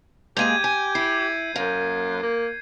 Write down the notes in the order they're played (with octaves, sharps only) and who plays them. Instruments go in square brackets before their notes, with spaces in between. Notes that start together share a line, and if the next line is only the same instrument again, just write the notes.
[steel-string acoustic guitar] G#3 A#3 G#4 [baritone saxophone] G4 [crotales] G6 G#6 D#7
[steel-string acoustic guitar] G#5
[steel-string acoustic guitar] E4 [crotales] C7
[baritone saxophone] F#2 [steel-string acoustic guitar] A#3
[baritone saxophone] A#3